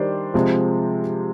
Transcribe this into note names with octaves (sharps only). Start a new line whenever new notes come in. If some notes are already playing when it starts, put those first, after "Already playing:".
Already playing: D#3 G3 D4 G4 C5
C3 F3 G#3 C4 F4